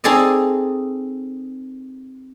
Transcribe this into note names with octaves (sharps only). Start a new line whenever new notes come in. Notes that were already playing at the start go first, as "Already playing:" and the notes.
C4 D#4 G#4 A4 D5 D#5